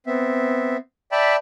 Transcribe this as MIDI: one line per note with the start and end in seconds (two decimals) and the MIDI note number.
0.07 0.77 59
0.07 0.77 60
0.07 0.77 76
1.12 1.36 74
1.12 1.36 76
1.12 1.36 79
1.12 1.36 81
1.12 1.36 83